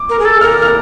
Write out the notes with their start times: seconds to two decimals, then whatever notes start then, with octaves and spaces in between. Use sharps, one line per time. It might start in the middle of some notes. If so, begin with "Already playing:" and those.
Already playing: D6
0.10 A#4
0.19 G#4
0.25 A4
0.41 A#4 F6
0.62 F6